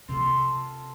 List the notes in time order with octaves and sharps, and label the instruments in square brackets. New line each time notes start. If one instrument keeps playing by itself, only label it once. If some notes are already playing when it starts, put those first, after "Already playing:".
[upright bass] C3 [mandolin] C4 F4 A4